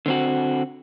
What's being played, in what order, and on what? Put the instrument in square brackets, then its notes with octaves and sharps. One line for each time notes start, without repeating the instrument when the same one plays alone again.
[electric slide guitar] D3 C4 F#4